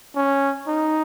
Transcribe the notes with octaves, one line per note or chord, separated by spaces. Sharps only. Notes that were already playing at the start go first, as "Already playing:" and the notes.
C#4
D#4